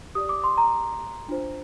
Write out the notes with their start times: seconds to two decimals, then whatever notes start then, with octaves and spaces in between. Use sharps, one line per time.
0.15 G4 D5 D#6
0.29 D6
0.44 C6
0.57 A#5
1.28 D4 F4 C5